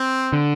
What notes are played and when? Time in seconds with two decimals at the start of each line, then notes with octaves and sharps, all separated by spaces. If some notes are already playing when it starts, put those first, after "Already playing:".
Already playing: C4
0.33 D3